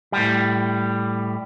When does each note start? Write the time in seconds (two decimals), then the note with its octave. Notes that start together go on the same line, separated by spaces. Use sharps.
0.12 A2 G3